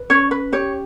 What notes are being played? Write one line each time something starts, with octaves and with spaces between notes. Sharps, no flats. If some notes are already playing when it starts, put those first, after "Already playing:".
Already playing: B4
C#4 C#5
B4
G4 C#5